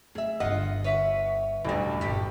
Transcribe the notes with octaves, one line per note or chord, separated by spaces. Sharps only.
A3 G#4 E5
G1 D3 F4 D#5 F#5
B4 C#5 E5 F#5
E1 A1 D2 E3 G3 A3
G1 A#2 G3 G4